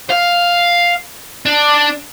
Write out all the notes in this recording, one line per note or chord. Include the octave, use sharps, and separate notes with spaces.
F5
D4